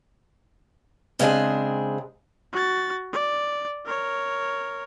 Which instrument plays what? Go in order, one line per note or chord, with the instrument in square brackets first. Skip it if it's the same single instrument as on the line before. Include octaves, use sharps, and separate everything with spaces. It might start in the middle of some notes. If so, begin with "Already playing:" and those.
[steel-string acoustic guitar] C#3 G#3 C4 D4 G#4
[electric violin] F#4 A6
D5
A#4 C#5